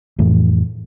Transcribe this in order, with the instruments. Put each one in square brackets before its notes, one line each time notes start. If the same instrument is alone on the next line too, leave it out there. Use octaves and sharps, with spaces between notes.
[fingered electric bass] F2 A2 E3 A3